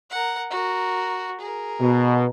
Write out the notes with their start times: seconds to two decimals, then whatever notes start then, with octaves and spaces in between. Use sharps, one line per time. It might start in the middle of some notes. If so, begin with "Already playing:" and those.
0.10 A#4 F#5
0.50 F#4 A#4
1.40 G#4 A#4
1.81 B2